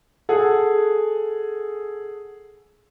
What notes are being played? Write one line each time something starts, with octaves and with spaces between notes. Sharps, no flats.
G#4 A4 F#5